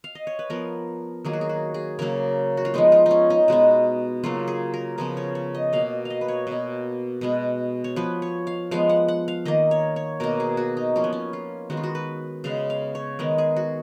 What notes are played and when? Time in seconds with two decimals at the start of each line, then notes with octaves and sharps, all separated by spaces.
0.04 F5
0.15 D#5
0.27 C#5
0.39 B4
0.50 F3 B3 A#4
1.25 D#3 F#3 A#3 G#4
1.33 F#4
1.41 G#4
1.49 F#4
1.74 G#4
1.99 C#3 F#3 A#3 A#4
2.57 F#4
2.65 F4
2.74 F3 G#3 B3 D#4
2.92 F4
3.06 C#4 D#4
3.30 D#4
3.48 B2 G#3 B3
4.23 C#3 F#3 A#3 F4
4.48 G#4
4.74 A#4
4.98 C#3 F3 B3 A#4
5.17 C#5
5.35 C#5
5.55 D#5
5.73 B2 A#3 F5
6.05 D#5 F5
6.21 B4
6.28 C#5
6.47 B2 A#3
7.21 B2 G#3 B3
7.84 C#5
7.96 F3 B3 B4
8.22 C#5
8.47 F5
8.71 F3 G#3 B3 F5
8.89 F#5
9.08 F#5
9.28 F5
9.45 D#3 A#3 D#5
9.71 C#5
9.96 C#5
10.20 B2 A#3 A#4
10.40 G#4
10.57 F#4
10.77 D#4
10.96 F3 A#3 C#4
11.04 B3
11.13 C#4
11.33 F4
11.70 D#3 G#3 B3 F#4
11.77 F4
11.83 F#4
11.95 B4
12.44 C#3 G#3 B3 F5
12.70 F5
12.95 C#5
13.19 D#3 G#3 B3 A#4
13.38 G#4
13.56 F#4